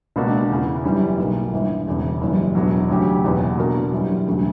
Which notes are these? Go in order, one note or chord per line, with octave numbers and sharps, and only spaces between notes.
C#2 B2 A#3 D4 F#4
E2 C#3 E3
F#2 E3 G3 C#4
B1 B2 A#3
G1 G2 E3
E1 E2 C#3
F#1 F#2 E3 G3
E1 E2 D3 F#3
D2 C#3 F#3 C#4 G4
F#1 E2 B2 F#3 B3
B2 A#3 D4 F#4 A#4
F#2 E3 G3 C#4
E1 D2 C#3 F#3